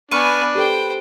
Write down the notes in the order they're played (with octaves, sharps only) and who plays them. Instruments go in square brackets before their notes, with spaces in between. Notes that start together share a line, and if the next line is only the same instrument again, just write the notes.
[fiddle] B3 G#5 [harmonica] D4 [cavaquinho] B4 C#6 [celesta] F6 D#7
[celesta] G4 A4 [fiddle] C5 G5